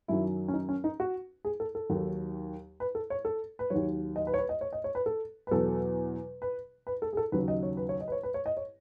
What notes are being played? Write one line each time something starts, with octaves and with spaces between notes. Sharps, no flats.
F#2 D#3 F#3 E4
C#4
D#4
C#4
D#4
F#4
G#4
A4
A4
D#2 D#3 F#3
B4
A4
C#5
A4
B4
D#2 D#3 F#3 C#5
D#5
B4
C#5
B4
D#5
C#5
D#5
C#5
B4
A4
B4
E2 B2 F#3 A4
B4
B4
A4
G#4
A4
D#2 C#3 F#3 B4
D#5
C#5
B4
C#5
D#5
B4
C#5
B4
C#5
D#5
C#5